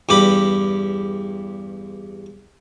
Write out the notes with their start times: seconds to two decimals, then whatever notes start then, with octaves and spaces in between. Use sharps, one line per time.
0.09 E2 G2 G4 B5